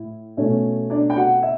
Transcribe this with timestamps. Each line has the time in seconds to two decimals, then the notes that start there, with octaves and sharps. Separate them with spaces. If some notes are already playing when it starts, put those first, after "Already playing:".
Already playing: A2 E4
0.37 B2 A3 C#4
0.90 D4 D5
1.10 G5
1.17 F#4 F#5
1.43 E5